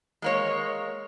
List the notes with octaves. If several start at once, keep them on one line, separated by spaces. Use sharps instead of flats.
G#3 A#3 C#5